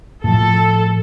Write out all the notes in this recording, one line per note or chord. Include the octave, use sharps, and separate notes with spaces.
A2 F3 A4